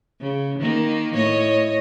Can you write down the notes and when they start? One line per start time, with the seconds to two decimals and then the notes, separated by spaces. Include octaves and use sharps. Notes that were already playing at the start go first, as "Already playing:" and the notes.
0.21 C#3
0.59 D#3 A#3
1.16 A2 C#5 D#5